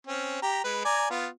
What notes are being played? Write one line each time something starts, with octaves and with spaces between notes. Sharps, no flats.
C4 C#4
G4 A#5
G#3 B4
D5 G#5 A#5
B3 F4